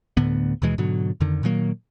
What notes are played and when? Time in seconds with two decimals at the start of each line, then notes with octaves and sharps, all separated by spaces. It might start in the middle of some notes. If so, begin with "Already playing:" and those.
0.17 D2 A2 D3 B3
0.62 D#2 B2 E3 G#3
0.78 G#2 B2 D3 F#3
1.20 F2 D3 D#3
1.43 A#2 D#3 F#3 A#3